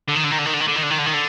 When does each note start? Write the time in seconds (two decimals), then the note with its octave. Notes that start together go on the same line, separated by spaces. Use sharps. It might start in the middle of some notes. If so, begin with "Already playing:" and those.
0.09 D3
0.16 D#3
0.24 D3
0.31 D#3
0.39 D3
0.46 D#3
0.54 D3
0.61 D#3
0.68 D3
0.76 D#3
0.83 D3
0.90 D#3
0.98 D3
1.06 D#3
1.13 D3